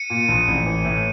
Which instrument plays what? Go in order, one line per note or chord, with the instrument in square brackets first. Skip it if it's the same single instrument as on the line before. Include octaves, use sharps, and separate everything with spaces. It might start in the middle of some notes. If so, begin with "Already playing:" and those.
Already playing: [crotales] C#7 D#7
[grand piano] A#2
A#1
A1
E3
A2